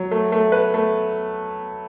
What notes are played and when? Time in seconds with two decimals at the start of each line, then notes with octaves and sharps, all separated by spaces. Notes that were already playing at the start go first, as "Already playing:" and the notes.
Already playing: F#3
0.11 A3
0.32 A3
0.52 B4
0.74 A3